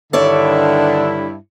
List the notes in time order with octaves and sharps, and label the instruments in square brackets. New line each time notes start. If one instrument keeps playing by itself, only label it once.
[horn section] G2 E4 [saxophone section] D3 D#3 D4 [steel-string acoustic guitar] A4 C#5 D5